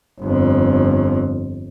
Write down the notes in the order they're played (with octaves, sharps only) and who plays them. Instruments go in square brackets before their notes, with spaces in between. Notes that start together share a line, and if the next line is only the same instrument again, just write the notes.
[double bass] G1 F2